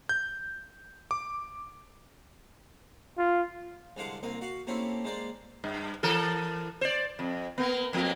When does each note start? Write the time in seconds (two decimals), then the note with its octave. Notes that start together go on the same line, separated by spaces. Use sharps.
0.09 G6
1.11 D6
3.18 F4
3.97 C2 D3 G#3 F5 F#5 D6
4.23 C2 A#3 C4 D#5
4.41 F#4 F5 F#5
4.67 A3 A#3 C4 C#4 E4 G4
5.05 G#3 A#3 C5 D5
5.64 G2
6.03 E3 A4 A#4
6.81 C5 D5
7.19 F2
7.58 A#3 B3
7.93 F2 F3 A#3